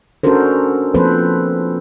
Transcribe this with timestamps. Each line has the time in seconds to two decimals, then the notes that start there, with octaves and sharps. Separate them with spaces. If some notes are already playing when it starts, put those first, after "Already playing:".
0.23 C#4 D4 F#4 A4 A#4 C5
0.94 F3 A#3 C4 A4 B4 C5